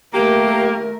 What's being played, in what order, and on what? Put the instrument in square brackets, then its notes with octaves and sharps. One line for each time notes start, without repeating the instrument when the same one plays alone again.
[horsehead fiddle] A3 A#4 [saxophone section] A#3 G4